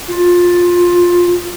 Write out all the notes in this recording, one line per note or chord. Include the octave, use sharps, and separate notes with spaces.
F4